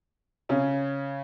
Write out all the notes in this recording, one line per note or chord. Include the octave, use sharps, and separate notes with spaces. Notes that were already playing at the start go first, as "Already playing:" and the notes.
C#3 C#4